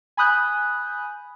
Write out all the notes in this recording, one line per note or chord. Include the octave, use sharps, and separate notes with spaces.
G#5 B5 D#6 F#6 G6